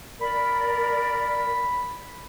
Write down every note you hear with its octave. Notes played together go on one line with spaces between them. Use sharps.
A#4 D5 B5